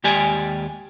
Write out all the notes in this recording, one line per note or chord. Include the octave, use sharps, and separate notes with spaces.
D#2 G#3 G4 D5 G#5